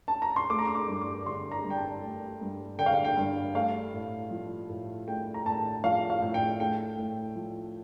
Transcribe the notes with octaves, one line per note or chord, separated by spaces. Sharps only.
A5
A#5
C6
A3 D6
A#5
C6
D6
G2
D6
D3 C6
A#5
G2
G5
A5
A3
G2
D3 G5
F5
G5
G5
G2
A3 F5
A2
F3
A2
A3 G5
A#5
A2 A5
F3 F5
F5
A2
G5
A3 G5
A2
F3